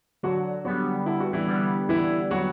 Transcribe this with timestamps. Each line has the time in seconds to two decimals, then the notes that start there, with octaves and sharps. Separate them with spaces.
0.23 D3 F#3 F#4
0.65 F#3 G3 B3 F#4
1.06 D3 E4
1.20 F#4
1.33 E3 E4
1.47 G3 B3
1.89 D3 E3 E4
2.31 F#3 G3 B3 F#4